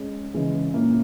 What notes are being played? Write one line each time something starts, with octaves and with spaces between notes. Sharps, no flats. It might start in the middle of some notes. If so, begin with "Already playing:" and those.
Already playing: G#3 C#4
C#3 E3 G#3 C#4 E4
A#2 A#3 C#4 E4